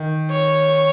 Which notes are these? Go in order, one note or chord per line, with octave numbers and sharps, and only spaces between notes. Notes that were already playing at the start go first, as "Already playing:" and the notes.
Already playing: D#3
C#5